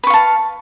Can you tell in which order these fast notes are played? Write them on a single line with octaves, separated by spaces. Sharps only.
B4 C#6 F5 A5